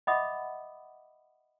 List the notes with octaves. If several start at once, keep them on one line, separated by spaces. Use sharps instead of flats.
D#5 E5 F#5 B5 D6 D#6